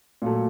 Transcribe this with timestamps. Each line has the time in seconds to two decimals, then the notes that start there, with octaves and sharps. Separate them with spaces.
0.22 A#2 F#3 A3